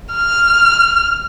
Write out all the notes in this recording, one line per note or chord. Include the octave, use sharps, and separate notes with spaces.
F6